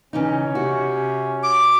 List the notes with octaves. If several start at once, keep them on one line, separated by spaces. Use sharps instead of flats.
C#3 E3 C#4 D#4
C3 F#4
D6